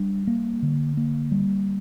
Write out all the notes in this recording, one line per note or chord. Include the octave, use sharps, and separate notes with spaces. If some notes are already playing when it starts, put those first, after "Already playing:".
Already playing: G3 D4
A#3
D3
A#3
G3